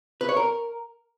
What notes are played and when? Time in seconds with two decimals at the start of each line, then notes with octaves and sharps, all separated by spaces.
0.21 B4
0.29 C#5
0.37 A#4